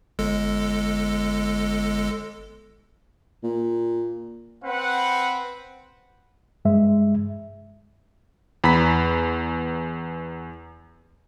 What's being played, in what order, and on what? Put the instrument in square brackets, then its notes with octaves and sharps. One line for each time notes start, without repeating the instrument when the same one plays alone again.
[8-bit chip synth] G1 G#3 A4
[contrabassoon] A#2
[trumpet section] C4 B4 F#5
[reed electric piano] G2 G#3 E5
[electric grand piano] E2 B5 B6